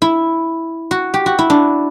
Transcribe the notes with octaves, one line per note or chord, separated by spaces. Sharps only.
E4
F#4
G4
F#4
E4
D4